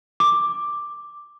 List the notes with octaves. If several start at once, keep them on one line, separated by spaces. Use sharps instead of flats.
D6